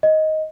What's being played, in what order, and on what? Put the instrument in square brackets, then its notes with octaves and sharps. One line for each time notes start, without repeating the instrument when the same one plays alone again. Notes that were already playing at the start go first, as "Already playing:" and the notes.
[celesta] D#5